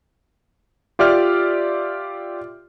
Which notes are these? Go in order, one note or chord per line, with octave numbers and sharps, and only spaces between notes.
F4 G4 D5 E5 F6